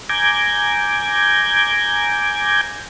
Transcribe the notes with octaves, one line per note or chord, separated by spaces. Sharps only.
G#5 A#5 D6 G6 G#6